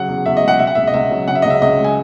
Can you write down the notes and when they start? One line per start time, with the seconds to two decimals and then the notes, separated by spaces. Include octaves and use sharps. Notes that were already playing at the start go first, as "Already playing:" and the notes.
Already playing: C#3 F#3 F#5
0.09 E2
0.26 E2 E5
0.37 D#5
0.42 G#3
0.48 F#5
0.59 B2 E5
0.67 F#5
0.75 C#2 E5
0.87 D#5
0.94 C#2 E5
1.11 F#3
1.27 C#3 F#5
1.35 E5
1.42 D#5
1.45 C#2
1.50 E5
1.62 C#2 D#5
1.78 G#3
1.84 G#5